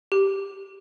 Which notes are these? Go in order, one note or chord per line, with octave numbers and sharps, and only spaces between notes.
G4